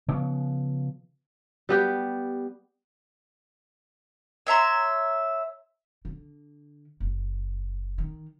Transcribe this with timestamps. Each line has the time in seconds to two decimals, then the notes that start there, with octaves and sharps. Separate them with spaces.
0.08 C#3 F3 B3
1.69 G3 B3 G4
4.47 C#5 E5 A#5 C6
6.05 D3
7.00 F#1
7.98 D#3